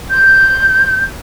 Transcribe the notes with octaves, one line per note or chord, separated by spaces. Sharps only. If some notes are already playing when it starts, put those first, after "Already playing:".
G6